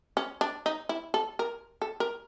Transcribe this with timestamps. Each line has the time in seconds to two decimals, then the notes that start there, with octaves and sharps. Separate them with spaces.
0.17 C#4
0.41 D4
0.66 D#4
0.89 E4
1.14 A4
1.39 A#4
1.82 A4
2.00 A#4